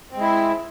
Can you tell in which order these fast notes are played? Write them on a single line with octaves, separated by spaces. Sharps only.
C4 G#3 E4